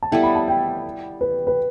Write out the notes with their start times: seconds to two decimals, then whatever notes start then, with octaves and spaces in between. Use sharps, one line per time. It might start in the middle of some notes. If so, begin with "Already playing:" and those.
0.03 A5
0.12 G3 B3 E4 A4 G5
0.23 B5
0.35 A5
0.48 G5
1.21 B4
1.47 B4